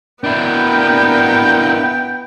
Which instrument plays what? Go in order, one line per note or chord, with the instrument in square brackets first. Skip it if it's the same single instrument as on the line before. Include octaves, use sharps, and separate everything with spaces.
[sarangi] B3 [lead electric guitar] D4 E4 [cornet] A#4 [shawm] G5